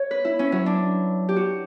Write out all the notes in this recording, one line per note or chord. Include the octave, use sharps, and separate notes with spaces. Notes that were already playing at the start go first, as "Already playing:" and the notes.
Already playing: C#5
B4
E4
C#4
F#3
D4
G4
F#4